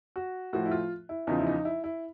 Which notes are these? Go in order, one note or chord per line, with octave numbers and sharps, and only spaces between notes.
F#4
A2 F3 F#4
E4
F4
E4
E2 C#3 F3 D#4
E4
D#4
E4
E4